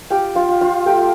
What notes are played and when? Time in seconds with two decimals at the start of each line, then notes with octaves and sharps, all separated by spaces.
0.10 F4 G4 G5
0.35 F4 F5
0.48 F4
0.61 F4 F5
0.86 A3 G4 G5